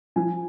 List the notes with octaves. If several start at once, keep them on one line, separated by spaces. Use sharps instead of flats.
F3 G#5